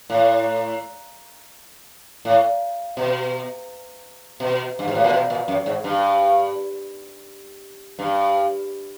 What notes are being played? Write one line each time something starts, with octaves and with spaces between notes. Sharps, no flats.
A2
A2
B2
B2
G2
G#2
A2
A#2
B2
A#2
F#2
G#2
G2
G2